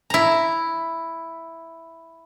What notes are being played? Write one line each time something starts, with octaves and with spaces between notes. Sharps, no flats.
E4 A#5